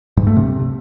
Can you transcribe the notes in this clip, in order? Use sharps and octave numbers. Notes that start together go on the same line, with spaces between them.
G2
A3
C3